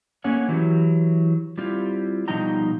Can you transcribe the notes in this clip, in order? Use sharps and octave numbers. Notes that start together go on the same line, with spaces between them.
A3 A#3 C#4 C#5 F#5 G#5
E3 F#3 E4 G4
G3 C4 E4 F4 G4
B2 F3 G3 D#4 G5 A#5